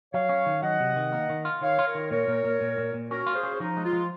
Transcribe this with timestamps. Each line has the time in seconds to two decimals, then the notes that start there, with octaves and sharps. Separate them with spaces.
0.13 F#3 C#5 F5
0.29 C#4
0.46 D#3
0.62 F#3 D#5 F#5
0.80 C3
0.96 D#3
1.13 A#3
1.30 D#3
1.45 F4
1.61 D#3 C#5 F5
1.79 F4
1.87 A#4 C#5
1.95 D#3
2.11 A#2 A#4 C#5
2.28 A#2
2.45 A#2
2.61 A#2
2.78 A#2
2.94 A#2
3.10 C#4 F#4 A#4
3.27 F4
3.35 G#4 C5
3.43 C#4
3.60 F3 D#4
3.77 G#3
3.85 F4
3.93 F3